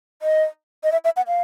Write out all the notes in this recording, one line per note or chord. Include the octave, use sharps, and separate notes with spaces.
D#5
D#5
E5
E5
F#5
F5